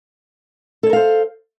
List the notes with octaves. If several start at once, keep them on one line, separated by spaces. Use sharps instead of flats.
A4 A#4 C5 C#5 F5